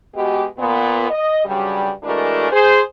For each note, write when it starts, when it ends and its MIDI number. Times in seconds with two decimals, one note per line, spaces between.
0.15 0.44 47
0.15 0.44 56
0.15 0.44 67
0.58 1.09 46
0.58 1.09 59
1.10 1.42 75
1.45 1.89 43
1.45 1.89 49
1.45 1.89 54
1.45 1.89 55
2.03 2.49 52
2.03 2.49 56
2.03 2.49 57
2.03 2.49 62
2.03 2.49 66
2.03 2.49 70
2.51 2.80 68
2.51 2.80 72